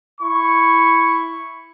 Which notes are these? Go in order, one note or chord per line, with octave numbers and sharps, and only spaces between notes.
E4 C#6